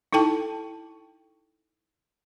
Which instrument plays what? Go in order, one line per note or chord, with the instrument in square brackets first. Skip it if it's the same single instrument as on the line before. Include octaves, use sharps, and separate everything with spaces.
[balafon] D#4 E4 A4 G5 A5